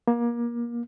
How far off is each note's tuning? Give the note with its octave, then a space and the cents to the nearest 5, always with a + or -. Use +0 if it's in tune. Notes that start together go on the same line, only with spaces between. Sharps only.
A#3 +25